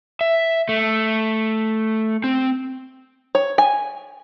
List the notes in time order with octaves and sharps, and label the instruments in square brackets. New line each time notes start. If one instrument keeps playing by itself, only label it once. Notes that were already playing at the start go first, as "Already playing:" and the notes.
[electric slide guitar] E5
A3
C4
[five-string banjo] C#5
G#5